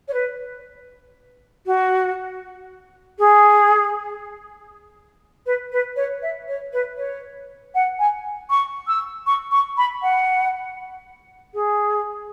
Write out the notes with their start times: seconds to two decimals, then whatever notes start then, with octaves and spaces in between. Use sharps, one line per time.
0.08 C#5
0.13 B4
1.66 F#4
3.18 G#4
5.46 B4
5.72 B4
5.96 C#5
6.22 E5
6.48 C#5
6.72 B4
6.97 C#5
7.74 F#5
7.99 G#5
8.50 C#6
8.87 E6
9.26 C#6
9.51 C#6
9.77 B5
10.02 F#5
11.54 G#4